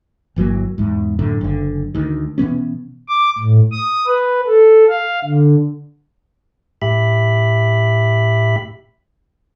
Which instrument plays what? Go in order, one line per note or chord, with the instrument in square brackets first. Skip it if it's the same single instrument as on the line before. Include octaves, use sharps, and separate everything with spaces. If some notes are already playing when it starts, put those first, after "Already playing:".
[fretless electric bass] G1 E3 F#3 A#3
E2 G#2
F#2 A2 D3
F#1 D3
D2 D#3
B2 E3 B3 C#4
[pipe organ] D6
A2
D#6
B4
A4
F5
D3
[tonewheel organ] A2 G4 E5 B5